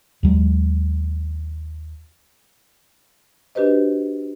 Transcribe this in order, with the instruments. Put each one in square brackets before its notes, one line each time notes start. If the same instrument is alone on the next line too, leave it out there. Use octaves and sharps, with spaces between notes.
[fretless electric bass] D#2 F#3 G#3
[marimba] D4 F#4 G4 B4 C5 D#5